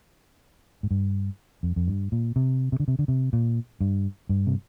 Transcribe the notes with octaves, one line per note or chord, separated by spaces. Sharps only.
G#2
G2
F2
F2
G2
A#2
C3
C3
D3
C3
D3
C3
A#2
G2
G2
C3